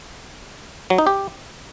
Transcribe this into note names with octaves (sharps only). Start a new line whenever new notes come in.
F#3
D#4
G4